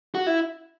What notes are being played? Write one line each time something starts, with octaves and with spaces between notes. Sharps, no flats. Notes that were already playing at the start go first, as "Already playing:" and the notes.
F#4
E4